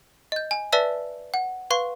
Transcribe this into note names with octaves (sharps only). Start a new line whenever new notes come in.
D#5 G6
G#5
B4 D5 E5 A5 E6 B6
F#5
B4 F5 C6 C#6